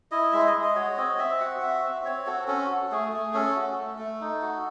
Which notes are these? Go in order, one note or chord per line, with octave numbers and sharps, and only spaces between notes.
E4 D#5
G#3 E5
D#5
G#3
D#5
F#4 C#5
C4 D#5
C4 E5
F#4 F#5
F#4 E5
C4
C4 C#5
F#4 A4
C#4 A4
F#4
A3 G#4
A3
C#4 A4
F#4
A3
A3
D#4
F#4